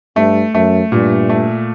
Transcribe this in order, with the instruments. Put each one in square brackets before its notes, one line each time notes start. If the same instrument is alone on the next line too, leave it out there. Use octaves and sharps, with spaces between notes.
[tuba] G2 [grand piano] A3
[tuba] F#2 [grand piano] A3
[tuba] G2 [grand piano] A#2
[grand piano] A3